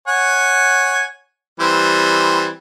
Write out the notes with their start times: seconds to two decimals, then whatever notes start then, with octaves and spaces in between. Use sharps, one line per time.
0.08 C#5 F#5 G#5
1.60 E3 G3 C4